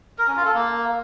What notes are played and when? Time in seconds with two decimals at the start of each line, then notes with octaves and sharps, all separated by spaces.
0.18 A#4
0.27 C#4
0.36 F4
0.45 A4
0.54 A#3